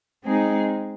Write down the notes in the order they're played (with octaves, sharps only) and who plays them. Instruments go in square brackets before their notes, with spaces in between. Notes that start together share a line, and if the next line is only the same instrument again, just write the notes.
[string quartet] G#3 C4 D#4 G#4